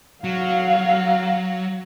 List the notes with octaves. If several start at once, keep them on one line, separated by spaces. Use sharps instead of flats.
F#3 F5 F#5